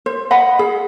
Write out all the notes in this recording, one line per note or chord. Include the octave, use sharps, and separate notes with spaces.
C5
D#5 F#5 B5
G#4